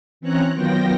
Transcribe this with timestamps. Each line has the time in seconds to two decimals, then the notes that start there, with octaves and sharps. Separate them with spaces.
0.21 E3 C4 C#4 C#5 A#5 F#6
0.54 D#3 F#3 B3 F4 G5 A#6